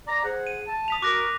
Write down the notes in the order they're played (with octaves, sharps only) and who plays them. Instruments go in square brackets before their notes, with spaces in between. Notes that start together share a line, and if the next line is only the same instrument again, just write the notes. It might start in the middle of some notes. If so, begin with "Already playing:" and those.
[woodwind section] D5 A#5
G#4 C5 F#5
[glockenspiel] D#7
[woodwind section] A5
[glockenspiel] D#6 B6 F7
[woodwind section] F#4 A#4 [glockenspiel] D6 F#6 A#6